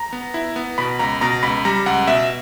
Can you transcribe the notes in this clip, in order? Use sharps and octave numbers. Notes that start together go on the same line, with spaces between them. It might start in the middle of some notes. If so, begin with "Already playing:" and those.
Already playing: A#5
B3
E4
B3
B2 B5
C#2 A#5
B2 A#5
C#2 B5
G3 A#5
C#2 F#5
B2 E5